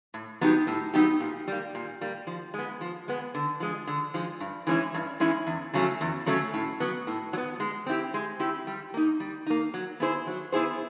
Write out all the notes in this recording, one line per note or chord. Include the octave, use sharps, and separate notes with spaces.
A2
F#3 B3 D#4 G4
A2
F#3 B3 D#4 G4
A#2
G3 A#3
A#2
G3 A#3
F3
G#3 B3
F3
G#3 B3
D3
F3 G#3
D3
F3 G#3
G2
E3 G#3 C#4 E4
G2
E3 G#3 C#4 E4
E2
C#3 F#3 A3 C#4
E2
C#3 F#3 A3 C#4
A2
F#3 B3
A2
F#3
B3
G#3
C4 E4 G4
G#3
C4 E4 G4
G3
A#3 D#4
G3
A#3 D#4
F#3
B3 E4 G#4 C5
F#3
B3 E4 G#4 C5